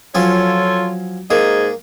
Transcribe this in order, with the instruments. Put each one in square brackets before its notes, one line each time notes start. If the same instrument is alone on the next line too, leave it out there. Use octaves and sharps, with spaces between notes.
[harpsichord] F3 F#3 C#4 [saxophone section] F4 A4 C#5
[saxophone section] G#2 G#4 D#5 [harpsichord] A#3